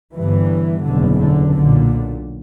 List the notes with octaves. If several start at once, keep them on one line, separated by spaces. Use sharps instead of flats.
G1 G2 E3
F#1 E2 B2 D3
D3
B1 A#2 D3